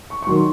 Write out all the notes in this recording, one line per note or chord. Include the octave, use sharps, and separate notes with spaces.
C#6
C#6
D#3 F#3 C6